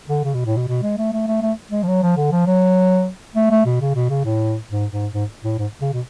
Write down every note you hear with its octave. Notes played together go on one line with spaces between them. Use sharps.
D3
C#3
B2
A2
B2
B2
G#3
A3
A3
A3
A3
G#3
F3
F#3
F3
D3
F3
F#3
A3
A3
B2
C#3
B2
C#3
A2
G#2
G#2
G#2
A2
G#2
C#3
B2